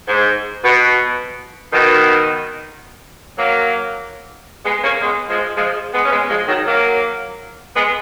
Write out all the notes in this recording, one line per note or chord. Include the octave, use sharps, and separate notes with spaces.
G#2
B2
B2 D#3
F#3 A#3
G#3 B3
A#3 C#4
G#3 B3
F3 G#3
F3 G#3
G#3 B3
C#4
G#3 B3
F3 G#3
D#3 F#3
F#3 A#3
G#3 B3